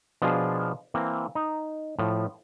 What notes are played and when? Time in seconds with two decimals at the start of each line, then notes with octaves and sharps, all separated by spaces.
0.22 B2 F3 D4 F4 G#4 A#4
0.94 E3 A#3 C4
1.35 D#4
1.99 A2 F3